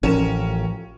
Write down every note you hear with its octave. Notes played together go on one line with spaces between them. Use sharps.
A1 F3 C#4 A#4 E7